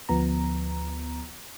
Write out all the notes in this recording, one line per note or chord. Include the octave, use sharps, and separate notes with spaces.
D2 F3 B3 A#5